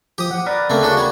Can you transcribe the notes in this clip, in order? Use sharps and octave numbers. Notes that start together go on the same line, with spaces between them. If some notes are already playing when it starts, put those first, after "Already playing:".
F3 G4 D#6
F#5
A#4 B4 D5
C#3 A3 A#3 C4
C#3 D4 F#4
G3 G#6